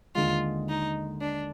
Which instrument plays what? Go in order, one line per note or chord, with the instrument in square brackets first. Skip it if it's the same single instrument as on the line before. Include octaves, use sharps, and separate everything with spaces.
[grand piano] D#2 D3 G#3 [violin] F4
[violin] D#4
D4